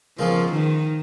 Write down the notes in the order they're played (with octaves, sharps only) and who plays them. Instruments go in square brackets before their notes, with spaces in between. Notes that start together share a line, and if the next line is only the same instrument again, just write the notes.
[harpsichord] C#2 B2 A#3 F4 G#4 [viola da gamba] F3
[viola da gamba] D#3